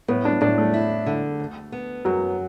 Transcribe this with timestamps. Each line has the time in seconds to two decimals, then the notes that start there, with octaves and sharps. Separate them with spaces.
0.08 A2 B3
0.25 D4
0.41 A2 D4
0.58 A3
0.74 E4
1.06 D3
1.40 D2
1.72 B3
2.05 F#2 F#3